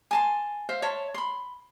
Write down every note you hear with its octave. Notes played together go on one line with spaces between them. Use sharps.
G#5 A5 C6
C5 E5 F5
C#5 E5 A5 C6
B5 C6